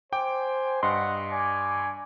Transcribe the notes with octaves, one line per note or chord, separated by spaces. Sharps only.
C5 G5 G#5 D6
G2 D#5 F#5 C6
D5 G#5